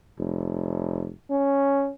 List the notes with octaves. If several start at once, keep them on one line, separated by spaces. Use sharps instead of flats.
F1
C#4